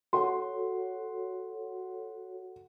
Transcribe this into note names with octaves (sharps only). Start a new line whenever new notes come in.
F#4 A4 C#5 F#5 C6